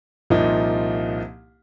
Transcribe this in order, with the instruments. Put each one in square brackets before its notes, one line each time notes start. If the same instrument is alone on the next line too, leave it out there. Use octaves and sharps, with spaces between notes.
[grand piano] C2 A#2 F3 A#3 D#4